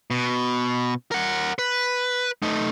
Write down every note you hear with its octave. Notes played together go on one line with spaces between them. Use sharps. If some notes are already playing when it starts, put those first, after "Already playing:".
B2
A#4 F#5
B4
A3 D#4